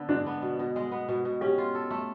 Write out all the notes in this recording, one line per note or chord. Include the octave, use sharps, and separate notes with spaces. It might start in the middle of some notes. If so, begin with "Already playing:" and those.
Already playing: D3 B3
G#3 D4
B3
B2
B2
G#3
B3
B2
B2
C#4 G4
F4
A4
A3